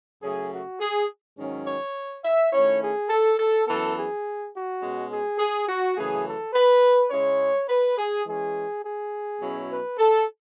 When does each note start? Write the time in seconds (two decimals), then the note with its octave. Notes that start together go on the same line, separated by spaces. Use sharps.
0.22 F#2 C#3 F#3 A3 G#4
0.51 F#4
0.80 G#4
1.37 G#2 D#3 F#3 C#4
1.66 C#5
2.23 E5
2.51 D#3 A3 C#4 E4 C#5
2.81 G#4
3.09 A4
3.38 A4
3.67 F#2 E3 B3 A4
3.95 G#4
4.53 F#4
4.81 B2 G#3 C#4
5.10 G#4
5.38 G#4
5.68 F#4
5.96 F#2 C#3 E3 A3 G#4
6.25 A4
6.53 B4
7.11 C#3 G#3 C#4 E4 C#5
7.68 B4
7.98 G#4
8.25 E3 G#3 C#4 G#4
8.84 G#4
9.40 B2 F#3 C#4 E4
9.70 B4
9.98 A4